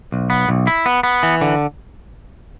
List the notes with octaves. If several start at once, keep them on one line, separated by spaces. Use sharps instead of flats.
B1
B3
B1
E4
B3
B3
E3
D3